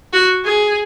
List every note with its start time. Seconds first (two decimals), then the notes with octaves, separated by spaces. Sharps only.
0.13 F#4
0.45 G#4